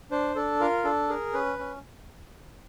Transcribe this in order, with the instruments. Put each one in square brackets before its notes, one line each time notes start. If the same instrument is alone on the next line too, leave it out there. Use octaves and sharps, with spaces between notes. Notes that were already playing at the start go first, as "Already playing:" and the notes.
[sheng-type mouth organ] D4 C5
D4 A4
F4 A#4
D4 A4
G#4 A#4
C#4 B4
C#4